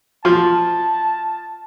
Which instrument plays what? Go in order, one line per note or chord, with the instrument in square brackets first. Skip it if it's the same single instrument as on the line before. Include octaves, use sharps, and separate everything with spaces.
[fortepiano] F3 [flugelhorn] A5